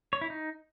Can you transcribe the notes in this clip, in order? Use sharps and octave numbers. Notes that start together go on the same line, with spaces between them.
C#5
E4
D#4